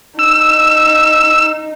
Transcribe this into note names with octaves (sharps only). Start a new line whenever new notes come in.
D#4 E6